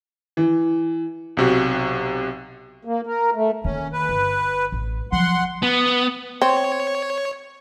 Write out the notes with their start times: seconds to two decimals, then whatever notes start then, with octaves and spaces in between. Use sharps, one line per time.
0.37 E3
1.37 B1 C3 F#4
2.85 A#3
3.07 A#4
3.35 A3
3.64 D#3 A#3 C#4
3.93 B4
4.09 G1
4.72 A1
5.12 F3 F#3 F#5 C6
5.63 B3
6.42 C4 C#5